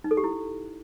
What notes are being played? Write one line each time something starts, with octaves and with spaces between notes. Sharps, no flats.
D#4
A4
G4
E4